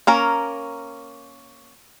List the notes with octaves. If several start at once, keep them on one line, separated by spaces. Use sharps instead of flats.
A#3 C#4 A#4